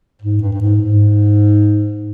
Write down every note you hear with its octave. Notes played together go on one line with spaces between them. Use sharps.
G#2
G2
G2
G#2
G#2